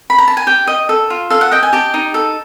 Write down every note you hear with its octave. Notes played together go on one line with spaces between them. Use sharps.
B5
A#5
A5
G#5
G4 G5
D#5
A4
F4
A4 F5
F#5
D#5 G5
G#5
G4 A5
D#4
A4